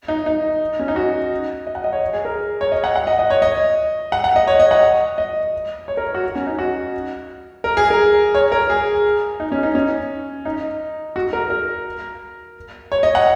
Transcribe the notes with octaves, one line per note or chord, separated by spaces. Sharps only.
D#4
D#4
C#4
D#4
F#4
D#5
F#5
D#5
C#5
G#4
A#4
C#5
D#5
F#5
F#5
D#5
D#5
C#5
D#5
F#5
F#5
D#5
C#5
D#5
F#5
D#5
C#5
A#4
F#4
C#4
D#4
F#4
A#4
G#4
A#4
C#5
A#4
G#4
D#4
C#4
D#4
C#4
D#4
F#4
A#4
A#4
C#5
D#5
F#5